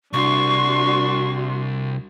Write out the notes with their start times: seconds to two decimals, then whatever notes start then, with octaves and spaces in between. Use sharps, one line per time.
0.13 C2 D4 F#4 C6 C#6